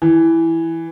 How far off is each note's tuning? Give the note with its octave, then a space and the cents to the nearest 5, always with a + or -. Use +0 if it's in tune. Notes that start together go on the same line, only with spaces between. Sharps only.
E3 +0